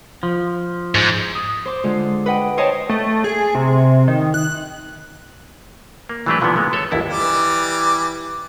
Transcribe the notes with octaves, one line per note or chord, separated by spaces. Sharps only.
F3
G#2
D#6
C5 C6 D6
D3 G#3 F4
B4 D#5 F#5 G5
C5 C#5 D#5 F5 G5 A5
A3
G#4
C3
D#3
F#6
A#3
E3 F#3 A3 D4 G4 B4
A#2 D3 E3 F3 G#3 B3
G#3 A3 B3
A4 C#5
G1 D#2 E4 A4
E3 G3 D6